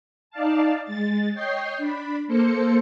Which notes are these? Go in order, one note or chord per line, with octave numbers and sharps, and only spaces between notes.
D#4 D5 F5 A5
G#3 A6
C#5 D#5 G5 G6 C7
D4 B5
A#3 A4 C5 C#7